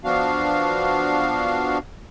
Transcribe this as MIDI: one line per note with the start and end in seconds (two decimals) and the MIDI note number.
0.04 1.78 53
0.04 1.78 59
0.04 1.78 62
0.04 1.78 66
0.04 1.78 77